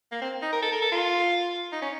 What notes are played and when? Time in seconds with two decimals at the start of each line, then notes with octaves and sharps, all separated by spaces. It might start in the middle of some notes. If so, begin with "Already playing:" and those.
0.12 A#3
0.22 C4
0.42 D#4
0.53 A#4
0.62 A4
0.72 A#4
0.82 A4
0.92 F4
1.72 D#4
1.82 C#4